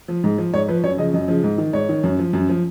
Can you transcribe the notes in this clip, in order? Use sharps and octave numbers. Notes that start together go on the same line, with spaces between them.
F3
G#2
F3
G#2 C#5
F3 B4
F#2 C#5
C#3 F3 D#5
F#2 D#5
C#3 F3
G#2
D#3
G#2 C#5
D#3
F#2
F3
F#2
F3